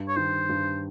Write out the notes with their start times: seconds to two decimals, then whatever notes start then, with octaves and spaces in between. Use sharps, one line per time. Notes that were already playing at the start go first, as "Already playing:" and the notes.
Already playing: G2
0.09 C#5
0.16 D#3 C5
0.49 G2